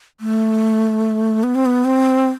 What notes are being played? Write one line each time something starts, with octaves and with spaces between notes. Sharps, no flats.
A3
B3
C4
B3
C4